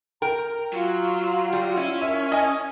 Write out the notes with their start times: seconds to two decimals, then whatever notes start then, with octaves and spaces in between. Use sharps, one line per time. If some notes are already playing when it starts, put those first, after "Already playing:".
0.22 A#4 G5 A#5
0.73 F#3 F4
1.53 G3
1.77 C#4 E4
2.01 A#4 E5
2.32 D#5 G#5